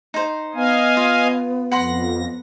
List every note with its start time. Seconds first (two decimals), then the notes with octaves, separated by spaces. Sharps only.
0.14 D#4 C5
0.54 B3 D#5 F5 G#5
0.97 F4
1.72 F2 F#5 B5 C6 A#6